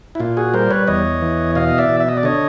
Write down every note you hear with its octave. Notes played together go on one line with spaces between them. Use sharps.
E4
A#2 F4
F#4 G#4
G3 A#4 C5
B4 C#5
E2 C#5 D#5
E3
B2 D#5 F5
D#5
D5 E5
B2
E5
D#5
D5
D3 C#5 D#5